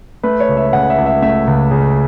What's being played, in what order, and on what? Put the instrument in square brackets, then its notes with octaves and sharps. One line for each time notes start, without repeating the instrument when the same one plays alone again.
[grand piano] A3 B4
C#5
C#2
E5
C#3 F#5
E5
C#2
E5
A3 E5
C#2
C#3